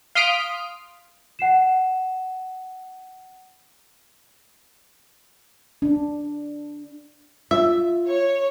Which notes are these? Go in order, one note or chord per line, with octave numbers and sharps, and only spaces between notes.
F5 C6 D#6 F6 B6 D7
F#5 C7 E7
D4
F4 E5
C#5